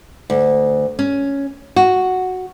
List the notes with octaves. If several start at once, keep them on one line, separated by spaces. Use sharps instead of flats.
D2
C#4
F#4